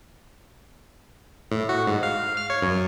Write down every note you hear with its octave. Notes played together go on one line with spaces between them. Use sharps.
A2
F#4
G#2
F5
F6
C#5
F#2